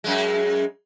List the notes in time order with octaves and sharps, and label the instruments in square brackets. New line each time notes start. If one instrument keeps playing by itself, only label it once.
[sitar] F#2 G#3